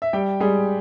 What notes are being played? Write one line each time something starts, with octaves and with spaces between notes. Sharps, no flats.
E5
G3 G4 G5
G3 G#3 G#4